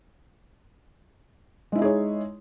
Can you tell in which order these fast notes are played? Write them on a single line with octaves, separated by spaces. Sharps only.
G#3 E4 D#4 G#4 C#5